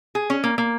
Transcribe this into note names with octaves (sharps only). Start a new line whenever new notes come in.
G#4
C#4
A#3
A#3